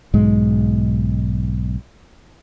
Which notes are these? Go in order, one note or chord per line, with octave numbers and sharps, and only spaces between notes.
B1 G#2 G#3